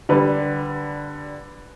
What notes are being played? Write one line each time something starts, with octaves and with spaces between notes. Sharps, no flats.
D3 G3 B4